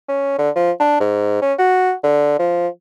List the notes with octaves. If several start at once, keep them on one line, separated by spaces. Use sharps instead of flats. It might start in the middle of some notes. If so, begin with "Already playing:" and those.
C#4
D3
F3
D4
G#2
C#4
F#4
D3
F3